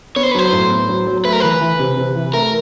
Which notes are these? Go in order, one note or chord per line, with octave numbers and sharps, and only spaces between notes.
B3 C#5
C5
B4
F#3 C5
A2
B3
F#3
F#3
A3 B4
A#4
E3 B4
E3
C3
C3
E3
A3 A#4